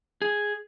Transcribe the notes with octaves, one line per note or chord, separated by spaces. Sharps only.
G#4